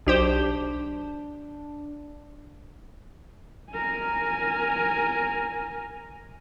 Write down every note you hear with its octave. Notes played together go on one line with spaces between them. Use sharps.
B1 D4 G4 C5
A#4 G#5